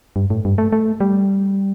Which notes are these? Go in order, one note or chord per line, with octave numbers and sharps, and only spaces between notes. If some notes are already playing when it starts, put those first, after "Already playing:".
G2
A2
G2
A3
A3
G3